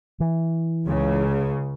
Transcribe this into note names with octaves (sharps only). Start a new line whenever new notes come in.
E3
C#2 C#3